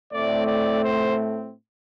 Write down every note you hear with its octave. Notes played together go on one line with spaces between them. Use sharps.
A2 A3 C4 D5
D5
C5